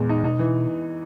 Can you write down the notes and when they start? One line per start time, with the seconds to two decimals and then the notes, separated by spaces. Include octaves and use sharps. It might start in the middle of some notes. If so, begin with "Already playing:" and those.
Already playing: E2 A#2 G#3
0.09 D#4
0.24 B2 D#4
0.39 E3